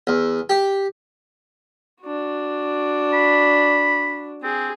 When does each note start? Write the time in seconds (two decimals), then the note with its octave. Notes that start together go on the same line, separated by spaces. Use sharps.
0.07 E2
0.50 G4
2.03 D4 F#4
3.13 B5
4.43 C4 G#4